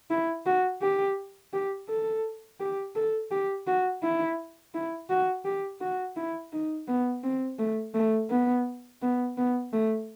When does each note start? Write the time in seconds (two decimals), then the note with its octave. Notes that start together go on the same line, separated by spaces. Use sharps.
0.11 E4
0.46 F#4
0.82 G4
1.53 G4
1.88 A4
2.60 G4
2.96 A4
3.31 G4
3.67 F#4
4.03 E4
4.74 E4
5.10 F#4
5.45 G4
5.81 F#4
6.16 E4
6.52 D#4
6.88 B3
7.24 C4
7.59 A3
7.94 A3
8.30 B3
9.02 B3
9.37 B3
9.73 A3